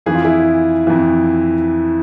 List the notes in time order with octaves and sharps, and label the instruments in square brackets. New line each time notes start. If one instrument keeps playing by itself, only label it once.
[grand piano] F2 E3 G#4
F4
E4 G#4
F2 E3